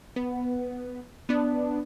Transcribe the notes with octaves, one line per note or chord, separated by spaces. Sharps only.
B3
B3 D4